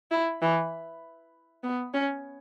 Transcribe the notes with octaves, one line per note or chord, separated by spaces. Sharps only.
E4
E3
B3
C#4